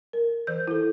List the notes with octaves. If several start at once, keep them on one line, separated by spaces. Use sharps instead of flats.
A#4
E3 C5 G6
E4 A4